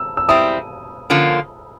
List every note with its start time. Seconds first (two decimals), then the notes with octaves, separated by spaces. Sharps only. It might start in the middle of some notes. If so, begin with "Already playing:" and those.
Already playing: E6
0.17 E6
0.29 G3 C4 E4 D#6
1.10 D3 F3 A#3 C#4 F4